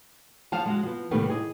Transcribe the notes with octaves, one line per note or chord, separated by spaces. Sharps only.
F3 D5 F5 F#5 A5
G#3 F#4
F3 B3
A2 C3 D#3 G3 A3 B3
G#4 D#5